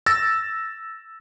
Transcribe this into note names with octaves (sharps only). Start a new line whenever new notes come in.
E6 A6 A#6